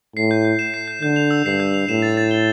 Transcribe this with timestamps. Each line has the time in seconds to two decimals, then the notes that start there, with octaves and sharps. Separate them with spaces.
0.16 A2 C7
0.31 G6
0.45 G6
0.59 E7
0.74 C7
0.88 G6
1.02 D3 G6
1.16 F7
1.31 E6
1.45 G2 C7
1.60 G6
1.74 F7
1.88 A2 E7
2.02 A6
2.17 A6
2.31 G7